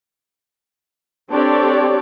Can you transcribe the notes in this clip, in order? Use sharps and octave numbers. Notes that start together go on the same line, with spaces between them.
C4 D4 G4 A4 C#5 D5